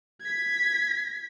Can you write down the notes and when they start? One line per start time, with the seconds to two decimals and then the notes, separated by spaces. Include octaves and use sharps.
0.21 G#6 B6